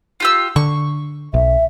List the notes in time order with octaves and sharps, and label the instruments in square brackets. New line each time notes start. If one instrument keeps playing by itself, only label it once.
[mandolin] F4 G4 E6
[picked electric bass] D3 [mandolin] C#6
[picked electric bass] B1 [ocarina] E5